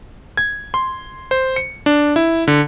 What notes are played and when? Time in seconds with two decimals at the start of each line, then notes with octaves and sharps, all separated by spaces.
0.37 G#6
0.74 C6
1.31 C5
1.56 C#7
1.86 D4
2.16 E4
2.48 D3